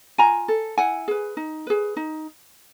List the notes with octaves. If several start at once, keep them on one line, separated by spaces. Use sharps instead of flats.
F4 G#5 A#5
A4
E4 F#5 G#5
G#4 B4
D#4
G#4 B4
D#4